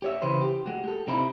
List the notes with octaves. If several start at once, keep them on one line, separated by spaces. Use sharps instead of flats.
G4 C#5 E5
C#3 E3 B4 C5
G4
G#3 F#4
G4 A4
C3 C4 D#4 E4 B5